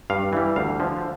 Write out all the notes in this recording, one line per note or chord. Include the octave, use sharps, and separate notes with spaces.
G2 F5
E3 G3
D2 F5
D3 F3